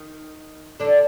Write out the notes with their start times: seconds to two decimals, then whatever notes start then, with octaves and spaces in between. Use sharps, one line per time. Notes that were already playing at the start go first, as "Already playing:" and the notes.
Already playing: D#3 D#4
0.80 D3 D4